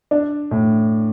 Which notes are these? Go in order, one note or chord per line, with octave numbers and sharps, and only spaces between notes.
D4
A2